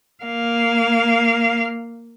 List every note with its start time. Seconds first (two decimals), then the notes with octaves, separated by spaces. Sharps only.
0.24 A#3 F5